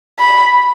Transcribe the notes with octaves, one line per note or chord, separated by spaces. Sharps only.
B5